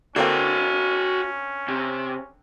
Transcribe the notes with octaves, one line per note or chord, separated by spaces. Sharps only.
D3 A#3 C4 C#4 F#4 F5
C3